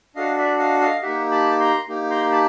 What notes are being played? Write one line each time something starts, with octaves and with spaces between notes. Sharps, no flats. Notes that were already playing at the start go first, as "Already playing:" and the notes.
D4 F#4 A4 D#5 F5
D5 E5
D#5 F5
D#5 F5
A#3 D#4 G4 E5 F#5
A5 B5
A#5 C6
A#3 D#4 G4
A#5 C6
A5 B5